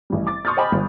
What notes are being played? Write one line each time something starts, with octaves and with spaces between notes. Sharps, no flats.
A1 G3
D6 A6
C6 C#6 D#6 F6 G6 A6
C5 D#5 G5 G#5 B5 D6
G1